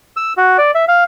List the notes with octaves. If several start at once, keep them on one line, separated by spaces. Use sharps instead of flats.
E6
F#4
D5
E5
F5